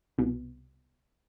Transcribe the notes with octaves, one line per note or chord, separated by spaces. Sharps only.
C2 B2